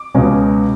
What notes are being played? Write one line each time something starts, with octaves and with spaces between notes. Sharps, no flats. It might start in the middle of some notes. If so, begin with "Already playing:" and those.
Already playing: D6
C#2 B2 G#3 C#4